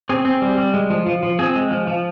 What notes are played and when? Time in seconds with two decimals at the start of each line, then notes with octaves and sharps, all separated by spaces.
0.09 C4 G#4
0.25 C4
0.42 G3
0.57 G3
0.74 G#3
0.90 F3
1.06 F3
1.23 F3
1.39 C4 G#4
1.56 G#3
1.71 F3
1.87 F3